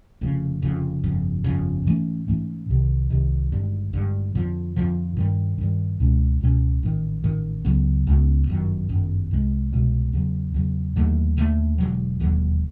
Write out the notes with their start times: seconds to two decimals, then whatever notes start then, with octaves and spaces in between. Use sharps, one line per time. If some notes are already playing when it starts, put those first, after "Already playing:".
0.21 F1 F2 C#3
0.62 F1 F2 C#3
1.04 G1 F2 C#3
1.44 G1 F2 C#3
1.86 G#2 E3 A3 C#4
2.28 G#2 E3 A3 C#4
2.69 C2 C3 D#3
3.10 C2 C3 D#3
3.52 G#1 G2 D3
3.93 G#1 G2 D3
4.35 F2 D3 F3
4.76 F2 D3 F3
5.17 G2 D#3 G3
5.58 G2 D#3 G3
6.00 C#2 B2 G#3 C#4
6.41 C#2 B2 G#3 C#4
6.83 A1 G#2 D#3
7.24 A1 G#2 D#3
7.65 C#2 C#3 F#3 B3
8.07 C#2 C#3 F#3 B3
8.47 G1 F#2 D#3
8.89 G1 F#2 D#3
9.31 C2 B2 G#3
9.72 C2 B2 G#3
10.13 E2 C#3 F#3
10.54 E2 C#3 F#3
10.96 D#2 D3 F#3 A3
11.37 D#2 D3 F#3 A3
11.78 E1 D#2 D3 F#3
12.20 E1 D#2 D3 F#3